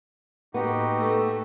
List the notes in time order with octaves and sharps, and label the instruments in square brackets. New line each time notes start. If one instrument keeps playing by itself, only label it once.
[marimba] A2 A#3 [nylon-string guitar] B3 [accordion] D#4 F#4 G4
[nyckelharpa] A3